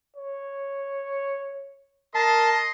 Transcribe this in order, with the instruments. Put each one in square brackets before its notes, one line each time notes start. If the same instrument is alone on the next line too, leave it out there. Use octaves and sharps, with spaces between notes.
[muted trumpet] C#5
[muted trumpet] A#4 [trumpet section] D#5 C6 [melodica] A5